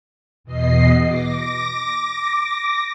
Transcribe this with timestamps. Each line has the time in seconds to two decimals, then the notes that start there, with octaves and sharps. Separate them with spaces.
0.44 E2 B2 D#5 C7
1.06 D6 A#6